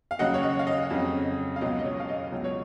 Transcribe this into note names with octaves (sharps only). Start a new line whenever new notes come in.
F5
D#2 C#3 F#3 D#5 F#5
C#5
D#5
F5
D#5
F2 C#3 F#3
F5
C#2 B2 F#3 D#5
D#5
C#5
F5
D#5
C#2 B2 F#3
C#5